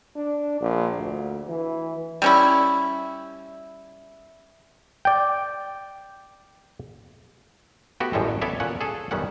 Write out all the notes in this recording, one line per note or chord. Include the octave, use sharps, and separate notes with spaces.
D4
A#1
D2
E3
G3 C#4 E4
D5 G5
A3 B3 F#4 G4
A1 F#2 A2 G3 G#3 A4
B3 A4 C#5 D5 E5
A#2 C#4 F#5
G#4 A4
B1 F#2 D#3 G3 C#4 F#5